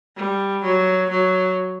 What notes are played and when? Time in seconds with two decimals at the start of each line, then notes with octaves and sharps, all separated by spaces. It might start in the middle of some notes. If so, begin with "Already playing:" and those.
0.17 G3
0.63 F#3
1.10 F#3